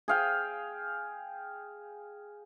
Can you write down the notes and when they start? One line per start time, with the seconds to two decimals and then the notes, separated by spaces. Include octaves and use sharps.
0.08 G#4 F5 G5